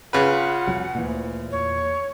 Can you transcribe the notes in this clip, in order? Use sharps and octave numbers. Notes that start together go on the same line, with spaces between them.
C#3 F4 B4 F#5
C2 F2 F#3
D2 A#2 E3
E2 C#5